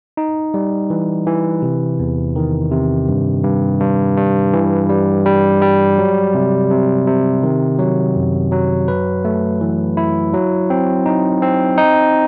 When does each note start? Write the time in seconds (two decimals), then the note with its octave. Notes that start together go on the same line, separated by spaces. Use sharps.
0.17 D#4
0.54 G3
0.90 E3
1.27 E3
1.62 C3
2.00 E2
2.36 D#3
2.71 C3
3.08 G2
3.44 G2
3.80 G2
4.17 G2
4.53 E3
4.89 G3
5.26 G3
5.62 G3
5.98 F#3
6.34 C3
6.71 C3
7.07 C3
7.43 D#3
7.79 F#3
8.16 F#2
8.52 F#3
8.88 B4
9.25 A3
9.61 E3
9.97 E4
10.34 F#3
10.70 C4
11.06 D#4
11.42 C4
11.78 D#4